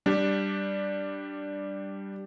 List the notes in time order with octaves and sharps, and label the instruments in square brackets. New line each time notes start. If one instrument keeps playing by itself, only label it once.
[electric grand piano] G3 D4 G4